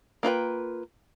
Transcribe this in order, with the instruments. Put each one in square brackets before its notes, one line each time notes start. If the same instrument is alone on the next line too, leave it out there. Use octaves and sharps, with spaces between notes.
[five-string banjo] A#3 F4 B4 G5